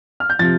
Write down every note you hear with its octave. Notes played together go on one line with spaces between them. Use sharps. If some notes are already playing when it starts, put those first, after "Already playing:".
F6
G6
C3 F3 A6